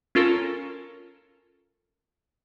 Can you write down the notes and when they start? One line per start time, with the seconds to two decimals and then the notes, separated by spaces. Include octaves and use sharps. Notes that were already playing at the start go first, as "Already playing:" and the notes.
0.15 C#4 F4 A4 A#4